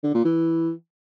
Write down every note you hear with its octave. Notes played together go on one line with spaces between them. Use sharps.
D3
A#2
E3